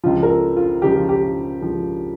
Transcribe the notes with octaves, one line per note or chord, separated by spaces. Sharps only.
C#2 C#3 F3 F4
A#4
A4
F4
C#2 C#3 F3 G4
F4
G4
C#2 C#3 F3